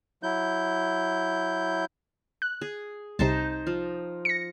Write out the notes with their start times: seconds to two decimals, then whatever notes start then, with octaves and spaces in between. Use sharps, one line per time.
0.23 F#3 E4 G6
2.42 F#6
2.62 G#4
3.19 C2 C3 D#4 C5 A5
3.67 F3
4.25 A#6 C#7